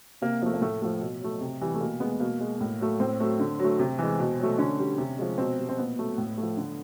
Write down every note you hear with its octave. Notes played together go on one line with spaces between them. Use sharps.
C3 A#3
F3 A3 A#3
A#3
A2 A3
F3 A3
B2
F#3 A3
C3
E3 G3
A3
B2 A#3
G#3 B3
B2 A#3
G#3
A2
F#3 A3
A2 C4
F#3 A3
D3
F#3 A3
C3
E3 G#3
B2
F#3 A3
D3 C#4
G3
C3
F3 G#3
B2 C4
G3
C4
A#2 B3
F#3 A3
A2
A3
F3
D3